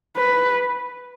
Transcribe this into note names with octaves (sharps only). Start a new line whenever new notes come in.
B4